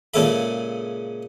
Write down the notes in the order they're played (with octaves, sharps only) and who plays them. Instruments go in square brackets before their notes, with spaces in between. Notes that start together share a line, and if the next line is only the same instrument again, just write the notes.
[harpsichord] A#2 C#3 G#3 A4 E5 B5